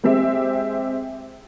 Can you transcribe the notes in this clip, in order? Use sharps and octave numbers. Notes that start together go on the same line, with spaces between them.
G#3 C4 G4 E5